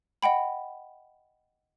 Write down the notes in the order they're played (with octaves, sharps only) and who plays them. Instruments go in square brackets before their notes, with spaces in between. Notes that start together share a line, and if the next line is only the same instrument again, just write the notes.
[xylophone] D#5 F#5 G5 B5